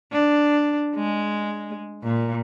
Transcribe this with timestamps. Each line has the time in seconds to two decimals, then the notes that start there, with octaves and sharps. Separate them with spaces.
0.12 D4
0.95 G#3
2.03 A#2